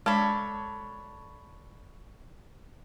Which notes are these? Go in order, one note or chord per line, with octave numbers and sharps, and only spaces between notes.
G#3 D4 A4 C#5 B5